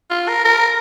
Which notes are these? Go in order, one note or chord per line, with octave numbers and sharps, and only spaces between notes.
F4
A#4
A#4